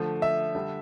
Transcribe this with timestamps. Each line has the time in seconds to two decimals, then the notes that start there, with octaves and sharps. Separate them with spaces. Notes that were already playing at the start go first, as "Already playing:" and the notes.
Already playing: D3 F3 A3
0.22 E5
0.55 D3 G3